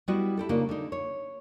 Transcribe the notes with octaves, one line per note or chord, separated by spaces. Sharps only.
G3 B3 E4 F#4 D#5
E4 G4 A4
C#3 A#3 D4 D#4 F4
D3 D#4
C#5